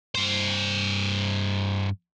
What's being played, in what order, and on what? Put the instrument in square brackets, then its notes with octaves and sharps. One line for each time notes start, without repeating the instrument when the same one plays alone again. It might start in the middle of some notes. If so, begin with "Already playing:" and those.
[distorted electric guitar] G2 C5